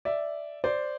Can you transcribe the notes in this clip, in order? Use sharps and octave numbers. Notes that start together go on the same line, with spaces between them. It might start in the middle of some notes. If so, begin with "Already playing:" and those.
D5 E5
C5 D5